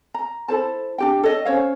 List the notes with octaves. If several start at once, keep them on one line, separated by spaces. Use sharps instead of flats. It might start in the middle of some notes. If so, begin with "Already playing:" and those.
A#5
E4 A4 C5 A5
D4 G4 G5
A4 C#5 D#5
C#4 C5 C#5 F5